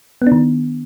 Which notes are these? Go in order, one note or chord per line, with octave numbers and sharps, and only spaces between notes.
B3
D4
D#3